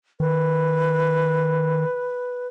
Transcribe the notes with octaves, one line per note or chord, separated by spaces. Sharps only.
D#3 B4